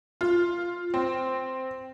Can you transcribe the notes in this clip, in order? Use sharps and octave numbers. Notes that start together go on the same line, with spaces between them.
F4
C4